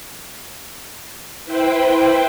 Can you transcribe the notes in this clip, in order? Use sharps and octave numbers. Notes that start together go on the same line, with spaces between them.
E4 B4 C5 G5